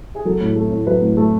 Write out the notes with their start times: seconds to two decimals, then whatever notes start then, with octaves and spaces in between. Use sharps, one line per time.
0.15 G#4
0.25 F#3 A4
0.41 A2
0.56 A3
0.71 A2
0.87 F#3 B4
1.02 A2
1.17 A3